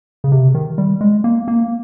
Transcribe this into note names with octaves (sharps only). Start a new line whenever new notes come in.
C#3
C3
D#3
G3
G#3
A#3
A#3